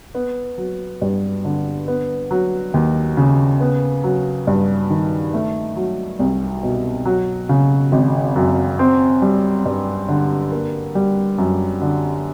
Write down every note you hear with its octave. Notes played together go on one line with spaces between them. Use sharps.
B3
F#3
G2
D3
B3
F#3
D#2
C#3
B3
F#3
G2
D#3
A3
F#3
C2
B2
F#3
C#3
G#1
F#2
C4
G3
G2
D3
A#3
G3
F#2
D3